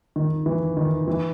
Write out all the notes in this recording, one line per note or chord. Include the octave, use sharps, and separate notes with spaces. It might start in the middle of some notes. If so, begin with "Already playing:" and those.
D#3
E3
D#3
E3